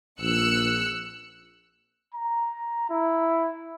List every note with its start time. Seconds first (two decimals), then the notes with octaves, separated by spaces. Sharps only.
0.21 A#1 E6 F#6 C#7
2.15 A#5
2.90 E4